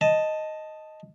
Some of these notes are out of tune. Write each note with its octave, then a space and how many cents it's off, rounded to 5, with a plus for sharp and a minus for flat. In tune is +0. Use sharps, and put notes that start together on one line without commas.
D#5 +0 A5 +0